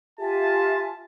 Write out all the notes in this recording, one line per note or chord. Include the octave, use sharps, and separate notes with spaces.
F4 G4 E5 G#5 A5